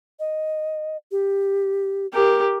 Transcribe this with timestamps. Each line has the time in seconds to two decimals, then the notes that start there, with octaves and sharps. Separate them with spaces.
0.20 D#5
1.11 G4
2.13 G4 A#4